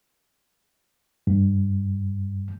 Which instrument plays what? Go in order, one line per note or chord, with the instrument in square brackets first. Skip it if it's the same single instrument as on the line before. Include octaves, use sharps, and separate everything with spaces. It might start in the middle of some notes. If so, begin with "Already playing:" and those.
[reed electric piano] G2